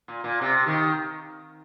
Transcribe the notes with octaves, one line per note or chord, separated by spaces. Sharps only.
A#2
A#2
C3
D#3